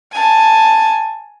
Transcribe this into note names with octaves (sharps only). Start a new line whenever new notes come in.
G#5 A5